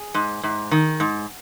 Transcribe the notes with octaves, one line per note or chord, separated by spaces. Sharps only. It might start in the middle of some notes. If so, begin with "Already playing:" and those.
Already playing: G#4
G#2
G#2
D#3
G#2